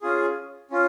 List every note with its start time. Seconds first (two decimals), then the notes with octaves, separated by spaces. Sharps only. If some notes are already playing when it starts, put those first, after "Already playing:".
0.02 C#4 F4 G#4
0.71 C#4 F4